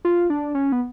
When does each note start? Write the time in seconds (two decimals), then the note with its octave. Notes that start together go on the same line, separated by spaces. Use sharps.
0.05 F4
0.30 D4
0.55 C#4
0.72 B3